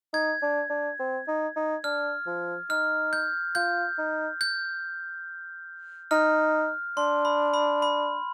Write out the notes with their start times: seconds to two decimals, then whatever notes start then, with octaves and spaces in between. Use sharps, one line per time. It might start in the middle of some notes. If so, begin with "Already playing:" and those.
0.13 D#4 G#6
0.42 D4
0.70 D4
0.99 C4
1.28 D#4
1.56 D#4
1.84 D4 F6
2.27 F3
2.70 D#4 F6
3.13 G6
3.55 F4 G6
3.98 D#4
4.41 G6
6.11 D#4 F6
6.97 D4 C6
7.25 B5
7.54 B5
7.82 B5